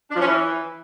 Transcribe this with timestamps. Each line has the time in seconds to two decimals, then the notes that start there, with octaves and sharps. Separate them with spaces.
0.10 D4
0.15 F3
0.21 C#4
0.26 E3